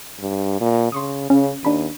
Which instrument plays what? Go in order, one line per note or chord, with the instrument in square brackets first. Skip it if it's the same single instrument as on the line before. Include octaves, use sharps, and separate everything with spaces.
[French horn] G2
A#2
[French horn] C#3 [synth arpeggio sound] C6 C#6 D#6
[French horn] C#3 [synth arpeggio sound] C#4
[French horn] D#2 [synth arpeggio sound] D4 B5 D#7